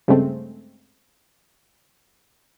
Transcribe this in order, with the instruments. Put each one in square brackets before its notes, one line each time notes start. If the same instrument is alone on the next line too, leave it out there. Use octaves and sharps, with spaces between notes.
[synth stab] G2 C#3 G#3 A3 C4